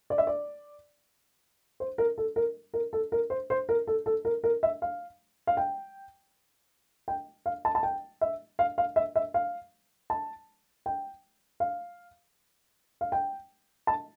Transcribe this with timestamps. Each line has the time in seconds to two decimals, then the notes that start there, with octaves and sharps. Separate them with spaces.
0.10 D5
0.18 E5
0.27 D5
1.80 C5
1.98 A#4
2.18 A4
2.36 A#4
2.74 A#4
2.93 A4
3.12 A#4
3.30 C5
3.50 C5
3.69 A#4
3.87 A4
4.06 A4
4.25 A#4
4.44 A#4
4.63 E5
4.82 F5
5.47 F5
5.57 G5
7.08 G5
7.46 F5
7.65 A5
7.75 A5
7.83 G5
8.21 E5
8.59 F5
8.78 F5
8.96 E5
9.16 E5
9.34 F5
10.10 A5
10.86 G5
11.60 F5
13.01 F5
13.12 G5
13.87 A5